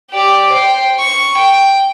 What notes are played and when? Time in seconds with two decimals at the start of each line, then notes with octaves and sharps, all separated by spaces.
0.11 G4 D5
0.53 C5 G5
0.99 C#6
1.38 G5